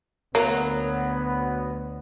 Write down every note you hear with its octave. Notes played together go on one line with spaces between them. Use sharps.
D2 F#3 A#3 B3